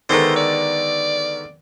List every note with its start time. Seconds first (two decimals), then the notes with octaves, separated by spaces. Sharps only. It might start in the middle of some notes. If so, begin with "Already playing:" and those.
0.09 D3 D#3 G#3 A3 B3 A#4 C5
0.36 D5